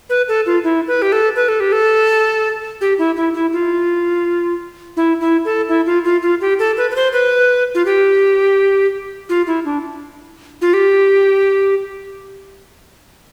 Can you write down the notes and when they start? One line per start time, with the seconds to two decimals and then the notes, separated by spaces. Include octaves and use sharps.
0.10 B4
0.28 A4
0.46 F4
0.64 E4
0.88 B4
1.02 G4
1.12 A4
1.36 B4
1.48 A4
1.60 G4
1.72 A4
2.81 G4
2.98 E4
3.16 E4
3.34 E4
3.53 F4
4.97 E4
5.21 E4
5.45 A4
5.69 E4
5.86 F4
6.04 F4
6.22 F4
6.41 G4
6.59 A4
6.77 B4
6.91 B4
6.96 C5
7.13 B4
7.75 F4
7.86 G4
9.29 F4
9.47 E4
9.65 D4
10.61 F4
10.74 G4